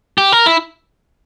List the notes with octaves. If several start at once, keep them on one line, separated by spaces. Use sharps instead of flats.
G4
A#4
E4